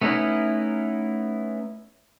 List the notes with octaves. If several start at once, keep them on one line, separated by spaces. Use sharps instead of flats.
A3 B3 C#4 D#4 E4